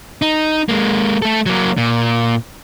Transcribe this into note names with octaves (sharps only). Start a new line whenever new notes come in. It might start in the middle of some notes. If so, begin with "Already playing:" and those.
D#4
G#3 A#3
A3 A4
F#3 A#3
A#2